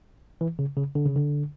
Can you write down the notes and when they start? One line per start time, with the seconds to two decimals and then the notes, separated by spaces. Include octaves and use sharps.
0.41 E3
0.59 C#3
0.77 C#3
0.95 D3
1.06 C#3
1.16 D3